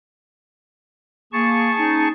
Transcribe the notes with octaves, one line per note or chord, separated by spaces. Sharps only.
A#3 G#4 A5 C#6
C#4 D#4